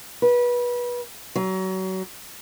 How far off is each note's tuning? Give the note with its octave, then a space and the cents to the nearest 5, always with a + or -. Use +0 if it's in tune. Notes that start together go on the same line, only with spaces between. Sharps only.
B4 -25
F#3 +30